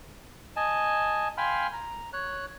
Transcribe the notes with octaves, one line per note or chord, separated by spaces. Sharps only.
D#5 G#5 A5
F5 G5 G#5 B5 C6 F6
A#5
C#5 F#6